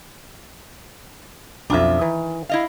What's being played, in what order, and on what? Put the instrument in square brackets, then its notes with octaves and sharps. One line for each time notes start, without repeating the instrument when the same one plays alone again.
[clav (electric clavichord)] B1 F2 [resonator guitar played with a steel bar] D4 F4 E5
[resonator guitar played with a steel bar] D#3 [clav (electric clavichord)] E3
[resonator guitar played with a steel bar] E4 D#5 F5